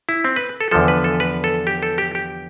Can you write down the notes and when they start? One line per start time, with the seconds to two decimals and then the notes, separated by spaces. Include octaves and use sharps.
0.09 E4
0.24 C4
0.36 B4
0.61 A4
0.71 E2 D3 F3 A4
0.88 B4
1.04 A4
1.20 B4
1.44 A4
1.67 G4
1.83 A4
1.98 G4
2.15 G4